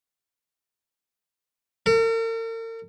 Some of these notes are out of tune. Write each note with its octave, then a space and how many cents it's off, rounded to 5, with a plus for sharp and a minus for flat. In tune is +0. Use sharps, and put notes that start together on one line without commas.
A#4 -45